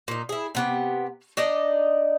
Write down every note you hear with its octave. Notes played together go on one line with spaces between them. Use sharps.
A#2 D#4
E4 G#4
C3 B3 G4
D4 D#4 D5 D#5